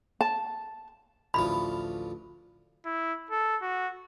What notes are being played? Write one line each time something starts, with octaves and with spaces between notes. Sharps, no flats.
A5
A1 D2 F3 B5
E4
A4
F#4